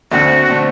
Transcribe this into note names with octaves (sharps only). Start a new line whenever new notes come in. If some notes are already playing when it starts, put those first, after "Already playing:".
D2 D3 A3 C4 F#4
D3 A3 C4